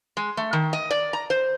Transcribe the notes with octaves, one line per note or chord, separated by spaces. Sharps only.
G#3
A3
D#3
D#5
D5
A#5
C5